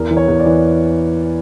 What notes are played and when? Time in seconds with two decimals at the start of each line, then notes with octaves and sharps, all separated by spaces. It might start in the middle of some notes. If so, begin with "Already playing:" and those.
Already playing: E2 A#4
0.11 E3
0.17 C#5
0.28 E2
0.40 D5
0.46 E3